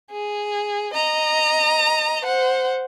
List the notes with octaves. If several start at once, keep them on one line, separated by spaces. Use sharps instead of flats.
G#4
D#5 A#5
C5 F#5